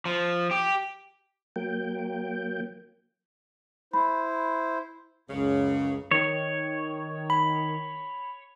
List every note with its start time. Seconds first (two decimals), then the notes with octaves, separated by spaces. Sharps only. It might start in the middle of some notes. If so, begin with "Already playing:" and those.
0.05 F3
0.51 G4
1.56 F#3 A#3 G5
3.93 E4 C5 B5
5.30 C#2 F#2 C#3
6.11 D#3 C#5
7.30 B5